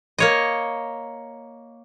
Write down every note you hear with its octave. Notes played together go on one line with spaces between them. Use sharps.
A#3 C#5 D#5